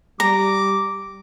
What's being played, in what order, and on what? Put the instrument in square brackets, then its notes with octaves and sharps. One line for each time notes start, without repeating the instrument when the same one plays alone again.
[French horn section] G3 [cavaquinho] A#5 [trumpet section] D6